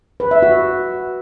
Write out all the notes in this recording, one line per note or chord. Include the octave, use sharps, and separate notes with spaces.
B4
E5
F#4